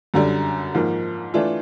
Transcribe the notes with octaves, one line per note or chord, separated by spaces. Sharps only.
F#2 D3 G3
G#2 F3 A#3
E3 A3 D4 F4